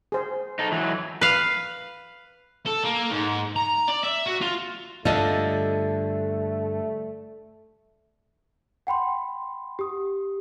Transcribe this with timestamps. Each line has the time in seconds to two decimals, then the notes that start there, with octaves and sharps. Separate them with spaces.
0.12 G#4 C5
0.59 D#4 A4
0.72 E3 F#3
1.21 B4 F5
2.66 A4
2.84 A#3
3.11 G#2
3.56 A#5
3.88 D5
4.04 E5
4.26 F#4
4.41 F4
5.05 G2 D3 A3 F4 A4 D5 D#5
8.87 F#5 G5 B5 C6
9.79 G4 D#6